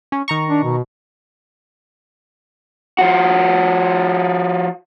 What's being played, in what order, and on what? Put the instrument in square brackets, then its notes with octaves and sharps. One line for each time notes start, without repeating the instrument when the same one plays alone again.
[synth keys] C#4
D#3 A#5 C#6
[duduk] D4
B2
[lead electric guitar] F3 F#4